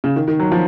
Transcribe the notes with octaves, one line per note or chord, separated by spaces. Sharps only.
C#3
D#3
D#3
F#3
F3